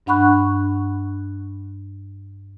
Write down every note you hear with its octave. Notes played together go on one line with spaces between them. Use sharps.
G2 D4 F#5 B5 C#6 F#6